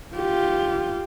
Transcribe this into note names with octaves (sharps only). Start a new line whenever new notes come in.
F4 G4